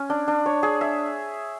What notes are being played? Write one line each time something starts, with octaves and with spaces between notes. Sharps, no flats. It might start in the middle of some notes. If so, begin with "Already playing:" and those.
Already playing: C#4
D4
D4
C#5
G#4
E5